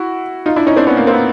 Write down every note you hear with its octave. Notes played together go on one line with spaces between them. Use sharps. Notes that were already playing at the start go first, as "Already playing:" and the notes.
Already playing: E4 F#4
D#4 F4
D4 E4
C#4 D#4
C4 D4
B3 C#4
A#3
A#3 C4
B3